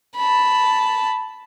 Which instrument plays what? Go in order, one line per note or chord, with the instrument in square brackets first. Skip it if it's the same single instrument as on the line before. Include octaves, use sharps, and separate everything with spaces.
[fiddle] A5 B5